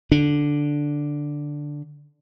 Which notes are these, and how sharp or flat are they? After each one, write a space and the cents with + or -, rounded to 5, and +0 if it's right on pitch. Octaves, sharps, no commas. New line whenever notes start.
D3 +0 D4 +0